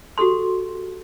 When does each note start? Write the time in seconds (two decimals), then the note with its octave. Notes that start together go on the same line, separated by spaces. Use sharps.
0.18 F#4 G4 A4 C6